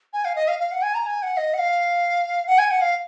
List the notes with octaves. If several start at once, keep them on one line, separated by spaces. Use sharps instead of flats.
G#5
F5
D#5
F5
F5
F#5
G#5
A#5
G#5
F#5
D#5
F#5
F5
F#5
G#5
F#5
F5